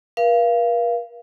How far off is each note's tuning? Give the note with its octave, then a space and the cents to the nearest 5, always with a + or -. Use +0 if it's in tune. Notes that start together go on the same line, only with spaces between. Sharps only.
A#4 +45 F5 -25